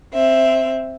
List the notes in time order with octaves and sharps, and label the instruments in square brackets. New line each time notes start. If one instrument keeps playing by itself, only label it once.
[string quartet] C4 E5